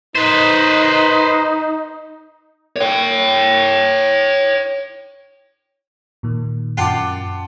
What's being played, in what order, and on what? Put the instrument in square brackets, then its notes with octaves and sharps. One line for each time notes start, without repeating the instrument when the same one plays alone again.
[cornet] D#4 [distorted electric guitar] B4 C5
[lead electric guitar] C#5 G5
[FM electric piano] A#2 D#3
[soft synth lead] F#2 [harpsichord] F4 G5 [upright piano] F#5 A5 D6